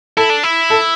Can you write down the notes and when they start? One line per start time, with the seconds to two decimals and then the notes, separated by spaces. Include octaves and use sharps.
0.17 E4 A4
0.30 D4
0.43 E4
0.70 A4